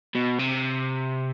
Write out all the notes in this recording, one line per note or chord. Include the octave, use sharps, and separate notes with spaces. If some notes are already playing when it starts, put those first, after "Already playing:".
B2
C3